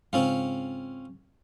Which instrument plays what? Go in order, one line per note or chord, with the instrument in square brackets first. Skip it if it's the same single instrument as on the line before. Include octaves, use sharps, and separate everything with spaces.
[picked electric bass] G#2 C#3 [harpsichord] C4 C#4 F4